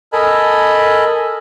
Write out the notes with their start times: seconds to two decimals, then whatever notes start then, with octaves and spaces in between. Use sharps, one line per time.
0.13 A4 A#4 D#5 G#5 A5 B5